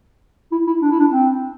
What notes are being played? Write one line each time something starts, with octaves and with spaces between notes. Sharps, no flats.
E4
E4
D4
E4
D4
C4